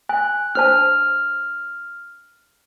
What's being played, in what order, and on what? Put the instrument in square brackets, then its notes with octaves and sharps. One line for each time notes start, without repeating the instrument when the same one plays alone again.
[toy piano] G#5 [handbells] F#6
[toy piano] D4 C5 A5 [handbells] F6